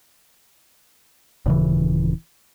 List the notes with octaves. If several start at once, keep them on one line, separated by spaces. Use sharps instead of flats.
D#1 C#3 E3